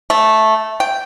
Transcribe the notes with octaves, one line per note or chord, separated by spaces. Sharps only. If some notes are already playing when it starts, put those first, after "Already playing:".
A3
G5